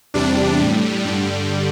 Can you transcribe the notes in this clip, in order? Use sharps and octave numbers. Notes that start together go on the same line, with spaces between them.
E2 C3 G3 D4
A2 G3
G2 D3 G3